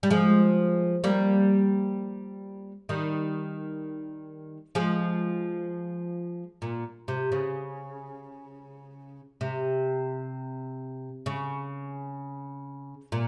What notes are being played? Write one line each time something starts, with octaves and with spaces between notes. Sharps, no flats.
G3
F3 G#3
G3 A#3
D#3 G3
F3 G#3
A#2
C3
C#3
C3
C#3
A#2